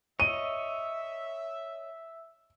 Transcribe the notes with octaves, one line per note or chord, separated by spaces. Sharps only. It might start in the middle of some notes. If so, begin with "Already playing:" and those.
C#5 D#5 E5 D#7